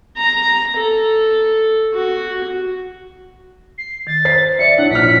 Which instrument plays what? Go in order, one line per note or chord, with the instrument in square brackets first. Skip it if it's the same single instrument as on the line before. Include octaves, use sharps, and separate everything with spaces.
[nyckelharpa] A#5
A4
F#4
[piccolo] C7
[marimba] D#3 [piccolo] A6
[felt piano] C5 B6 C7
[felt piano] D5 E5 [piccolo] C#7
[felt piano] D4 [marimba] E4 C#5 [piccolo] F#5
[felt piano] A#1 F6 [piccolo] B6